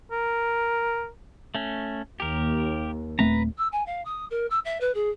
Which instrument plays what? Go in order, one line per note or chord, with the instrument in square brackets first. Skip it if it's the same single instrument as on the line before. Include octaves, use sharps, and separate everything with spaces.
[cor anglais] A#4
[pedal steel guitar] A3 C#4
[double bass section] D#2 [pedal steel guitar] G4 A#4
[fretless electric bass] D#1 A3 C4 [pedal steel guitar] B4 A#5
[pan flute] E6
G#5
F5
D#6
A#4
E6
E5
B4
G#4